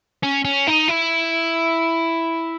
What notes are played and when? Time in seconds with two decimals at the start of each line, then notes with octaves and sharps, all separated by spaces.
0.23 C#4
0.45 C#4
0.67 D#4
0.88 E4